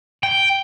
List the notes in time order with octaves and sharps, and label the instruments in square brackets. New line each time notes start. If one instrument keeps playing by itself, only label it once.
[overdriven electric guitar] G5